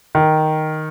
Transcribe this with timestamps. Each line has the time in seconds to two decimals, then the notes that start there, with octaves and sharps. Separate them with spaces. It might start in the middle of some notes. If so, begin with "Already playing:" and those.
0.15 D#3